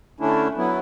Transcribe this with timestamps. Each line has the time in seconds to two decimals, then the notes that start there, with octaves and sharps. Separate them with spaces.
0.20 D3 A3 C#4 D4 E4
0.57 F#3 B3 E4